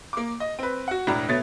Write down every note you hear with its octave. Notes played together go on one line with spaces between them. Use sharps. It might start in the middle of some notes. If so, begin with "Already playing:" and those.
A#3 D6
D#5
C4 B4
F#4 F#5
E1 A2 D4 A#5
B2 A3 B3 C#5 A6